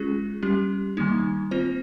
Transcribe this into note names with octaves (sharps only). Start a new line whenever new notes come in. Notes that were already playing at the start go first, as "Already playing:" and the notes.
Already playing: G#3 C#4 F4 G#4
G3 C#4 G4
D#3 G3 A#3 D#4
C4 F4 C5